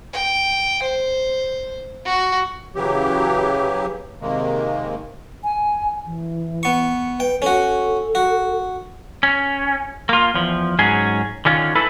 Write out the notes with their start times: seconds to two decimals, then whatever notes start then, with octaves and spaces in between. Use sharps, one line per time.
0.13 G5
0.82 C5
2.05 F#4
2.75 C#3 E3 F#3 G4
4.21 C3 D#3 G#3 A#3
5.44 G#5
6.05 E3
6.63 B3 C#6
7.20 B4 G5
7.42 C#4 F#4 A4
8.15 F#4
9.23 C#4
10.09 A#3 F4
10.34 E2 F3
10.79 G#2 F#3 C#4 G#4
11.45 D3 D#3 C#4 F4
11.75 E4 A4 B4